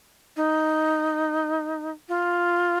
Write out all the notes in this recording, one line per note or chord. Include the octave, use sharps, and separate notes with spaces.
D#4
F4